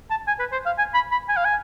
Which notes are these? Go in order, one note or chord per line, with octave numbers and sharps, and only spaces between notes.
A5
G#5
B4
C5
F5
G#5
B5
B5
G#5
F5
G#5